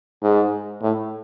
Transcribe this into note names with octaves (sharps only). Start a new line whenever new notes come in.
G#2
A2